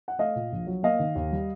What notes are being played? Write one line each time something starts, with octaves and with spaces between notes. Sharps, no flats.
F#5
A3 D#5 F5
A#2
A#1
F#3
A#3 D#5 F5
D#3
D#2
G3